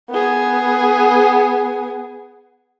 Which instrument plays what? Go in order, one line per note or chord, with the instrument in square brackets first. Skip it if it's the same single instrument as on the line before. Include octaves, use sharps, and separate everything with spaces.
[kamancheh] B3 G#4